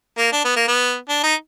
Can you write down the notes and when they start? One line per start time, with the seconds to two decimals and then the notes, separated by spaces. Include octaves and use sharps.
0.18 A#3
0.32 D4
0.44 B3
0.56 A#3
0.67 B3
1.09 D4
1.23 D#4